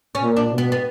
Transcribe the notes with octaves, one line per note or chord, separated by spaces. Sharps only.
C#4
A#2
D4
B2
B3
B3